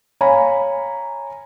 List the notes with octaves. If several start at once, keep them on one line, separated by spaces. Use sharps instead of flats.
C#5 F5 G#5 A#5 B5